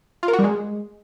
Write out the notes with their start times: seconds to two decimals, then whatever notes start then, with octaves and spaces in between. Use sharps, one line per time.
0.23 F4
0.28 A#4
0.33 F#4
0.39 G3
0.44 G#3